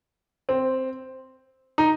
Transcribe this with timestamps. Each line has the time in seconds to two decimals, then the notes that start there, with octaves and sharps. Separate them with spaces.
0.49 C4
1.78 D#4